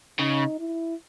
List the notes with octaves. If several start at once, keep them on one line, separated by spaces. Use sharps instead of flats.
C#3 D#4
E4